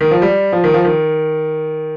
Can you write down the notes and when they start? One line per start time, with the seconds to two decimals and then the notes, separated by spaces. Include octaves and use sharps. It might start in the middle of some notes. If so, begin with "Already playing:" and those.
0.01 D#3
0.11 F3
0.22 G3
0.52 F3
0.64 D#3
0.74 F3
0.85 D#3